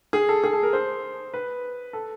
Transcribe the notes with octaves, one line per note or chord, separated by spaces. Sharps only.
G#4
A4
G#4
A4
A#4
C5
B4
A4